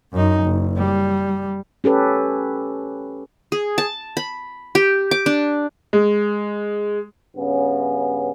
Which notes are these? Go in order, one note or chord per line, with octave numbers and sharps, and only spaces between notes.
F#2 D#4
F#1
G3
C#4 G4 A4 B4
G#4
A5
B5
G4
D6
D4
G#3
G2 C#3 B3 C#4